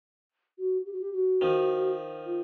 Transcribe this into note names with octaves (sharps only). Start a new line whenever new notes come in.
F#4
G4
F#4
G4
F#4
D#3 F3
F4